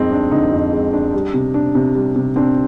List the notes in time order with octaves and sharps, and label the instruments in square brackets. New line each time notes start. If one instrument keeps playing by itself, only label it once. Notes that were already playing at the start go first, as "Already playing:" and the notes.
Already playing: [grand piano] F2 G#3 [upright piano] C4 D#4
[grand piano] D4
[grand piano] D3 [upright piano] D#4
[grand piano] F2
G#3
D4
G3
C3
D4
C3
G3
C3
[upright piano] C4 [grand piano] D4